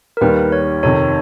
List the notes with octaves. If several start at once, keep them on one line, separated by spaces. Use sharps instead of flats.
A#4
D#2 D#3 G3 B4
C#5
F2 C3 D#3 C#5